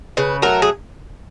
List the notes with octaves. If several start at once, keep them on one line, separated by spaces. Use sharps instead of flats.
C#3 B4
F#3 A3 A#4
G#4